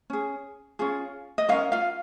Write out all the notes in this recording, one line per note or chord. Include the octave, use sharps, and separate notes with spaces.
C#4 G#4
C#4 F4 G#4
D#5
C#4 F4 A#4 F5
F4 F5